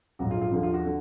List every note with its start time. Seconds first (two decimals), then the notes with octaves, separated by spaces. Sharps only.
0.19 A#1 G#2 F#3 F#4
0.31 F4
0.41 F4
0.51 D#2 D3 F3
0.63 F4
0.74 F#4
0.85 D3